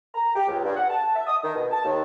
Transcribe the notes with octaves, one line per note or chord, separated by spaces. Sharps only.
A#5
G4
C#2
G2
F#5
A5
E5
D#6
D#3
B2
A5
D#2